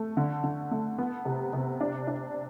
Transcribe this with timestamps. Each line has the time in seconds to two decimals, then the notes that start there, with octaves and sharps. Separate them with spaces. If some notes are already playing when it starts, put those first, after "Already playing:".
Already playing: A3
0.17 D3
0.44 D3
0.71 A3
0.98 B3
1.25 C3
1.53 C3
1.81 D4
2.07 D4